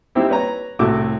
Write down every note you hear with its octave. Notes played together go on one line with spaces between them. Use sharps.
G3 C4 D#4 E4
B4 C#5 A#5
C2 A2 A3 F#4 D6